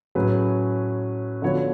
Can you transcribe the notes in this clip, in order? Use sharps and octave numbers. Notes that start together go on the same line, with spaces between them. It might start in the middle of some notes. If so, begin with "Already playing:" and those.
A2 F#3 C#4 G#4 B4
D3 F3 B3 F#4 C#5